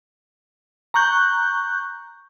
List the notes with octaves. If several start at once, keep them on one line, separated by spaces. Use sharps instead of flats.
A#5 C#6 F#6 G6